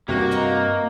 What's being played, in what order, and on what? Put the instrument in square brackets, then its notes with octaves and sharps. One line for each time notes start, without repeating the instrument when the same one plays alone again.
[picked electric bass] G2 C3 [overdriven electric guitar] A#3 [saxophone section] F#4
[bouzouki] D#4 D#5 A#5